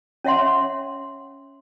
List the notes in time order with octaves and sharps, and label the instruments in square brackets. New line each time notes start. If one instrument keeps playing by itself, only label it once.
[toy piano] C#4 C#5 E5 F#5 C6